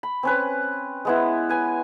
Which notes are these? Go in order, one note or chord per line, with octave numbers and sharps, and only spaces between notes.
B5
C4 C#4 B4
G#3 B3 E4
B4 G#5